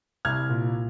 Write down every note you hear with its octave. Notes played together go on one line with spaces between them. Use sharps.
C2 F6 G#6
A#2